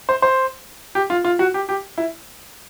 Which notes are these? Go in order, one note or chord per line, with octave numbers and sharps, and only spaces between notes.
C5
C5
G4
F4
F4
F#4
G4
G4
E4